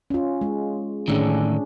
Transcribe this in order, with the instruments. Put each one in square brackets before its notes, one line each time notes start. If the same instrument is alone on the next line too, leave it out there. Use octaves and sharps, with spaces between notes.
[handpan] C#4 F4
G#3
[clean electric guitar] A2 D3 D#3 [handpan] C#4 D4 G#4